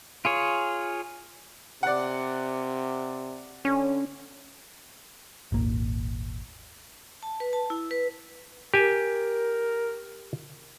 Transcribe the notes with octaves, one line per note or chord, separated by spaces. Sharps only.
F4 G#4 C#5
C3 D5 F#5
D3 C#4
D#1 G#1 A#3
A5
B4
A5
E4
B4
G4 A#4 G#5